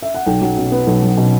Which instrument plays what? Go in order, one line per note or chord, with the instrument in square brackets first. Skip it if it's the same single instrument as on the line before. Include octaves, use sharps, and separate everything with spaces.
[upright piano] E5
F#5
B1 G5
F#3
B2
B3
B1
F#3
B2